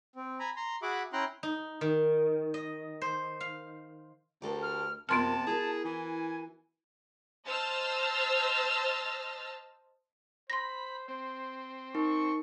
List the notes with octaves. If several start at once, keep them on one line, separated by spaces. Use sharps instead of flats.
C4
G#5 A#5 B5
A#5 C6
F#4 G#4 E5 F#5 B5 D6
C#4 E4 G5 A#5 C6 F#6
D#4
D#3
D#5
C5
F5
D2 G4 A4 A#4
F6
F#2 C3 F3 A#3 B3 A5 C6 F6
E4 F#4 G#4 A#4
E3 G#5
C5 D#5 A5 E6 F6 A6
C5 B5 C6 A#6
C4 C5
D#4 A#4 C#6